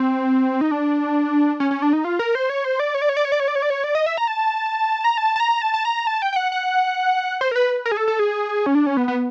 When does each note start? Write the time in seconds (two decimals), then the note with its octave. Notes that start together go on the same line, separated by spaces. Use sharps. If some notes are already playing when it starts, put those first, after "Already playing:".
Already playing: C4
0.61 D#4
0.71 D4
1.60 C#4
1.71 C#4
1.82 D4
1.93 D#4
2.04 F4
2.19 A#4
2.35 C5
2.49 C#5
2.64 C5
2.80 D5
2.95 C#5
3.02 D5
3.09 C#5
3.17 D5
3.25 C#5
3.32 D5
3.40 C#5
3.48 D5
3.55 C#5
3.62 D5
3.70 C#5
3.84 D5
3.95 D#5
4.06 E5
4.18 A#5
4.28 A5
5.04 A#5
5.18 A5
5.36 A5
5.40 A#5
5.62 A5
5.74 A5
5.85 A#5
6.07 A5
6.22 G5
6.33 G5
6.36 F#5
6.52 F#5
7.41 C5
7.51 A#4
7.56 B4
7.85 A#4
7.92 G#4
7.97 A4
8.08 A4
8.19 G#4
8.66 C#4
8.75 D4
8.86 C#4
8.97 B3
9.08 B3